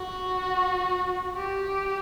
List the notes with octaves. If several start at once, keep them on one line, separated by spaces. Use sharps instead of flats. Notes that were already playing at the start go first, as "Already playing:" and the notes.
Already playing: F#4
G4